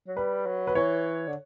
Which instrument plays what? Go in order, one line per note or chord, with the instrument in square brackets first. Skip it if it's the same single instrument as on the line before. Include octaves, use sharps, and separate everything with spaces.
[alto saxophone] F#3
[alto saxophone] G3 [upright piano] B4
[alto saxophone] F#3
[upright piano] B4
[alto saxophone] E3 [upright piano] C#5
[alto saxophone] D3